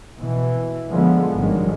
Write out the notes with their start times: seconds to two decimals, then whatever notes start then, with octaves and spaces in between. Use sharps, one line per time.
0.18 B2 E3
0.88 D3 F3 G#3 B3
1.35 G#1 G2 D3 D#3 F#3 G#3